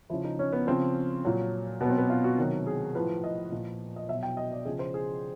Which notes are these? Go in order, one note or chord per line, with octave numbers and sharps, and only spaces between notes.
C#3 F3 E4
D#4
C#4
B3
C#3 F3 C4
A#2 F#3
B2 F#3 B3 C4
B3
F4
F#4
C3 D#3 F#3
G#4
A2 F3 B4
D#5
A#2 F3
D#5
B2 F#3 E5
G5
D#5
D5
C#3 F3 G#4
C5
G#4